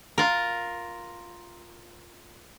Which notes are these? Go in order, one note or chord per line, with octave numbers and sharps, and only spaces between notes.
F4 A#4